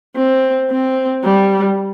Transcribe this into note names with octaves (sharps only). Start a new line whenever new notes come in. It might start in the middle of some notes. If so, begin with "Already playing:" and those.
C4
C4
G3